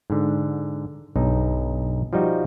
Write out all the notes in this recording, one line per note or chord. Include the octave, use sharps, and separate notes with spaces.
G#2 D3
B1 G2 D#4
F3 G3 D#4 F#4